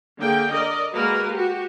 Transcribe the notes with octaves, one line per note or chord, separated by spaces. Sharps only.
D3 A#3 G#4 G5
A#4 D5 D#5
G#3 A#3 F#4 A#4 B4
F#4 G4